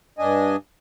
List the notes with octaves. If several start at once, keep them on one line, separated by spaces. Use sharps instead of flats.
G2 D4 D#5 G#5